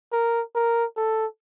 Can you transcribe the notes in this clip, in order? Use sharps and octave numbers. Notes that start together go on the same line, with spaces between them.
A#4
A#4
A4